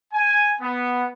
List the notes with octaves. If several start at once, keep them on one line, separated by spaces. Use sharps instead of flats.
G#5
B3